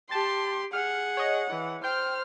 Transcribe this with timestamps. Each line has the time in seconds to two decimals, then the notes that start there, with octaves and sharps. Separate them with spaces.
0.11 G4 A5 C6 A6
0.73 G#4 F#5 F6
1.17 C#5 D#5
1.50 E3
1.84 C5 G5 F6 G6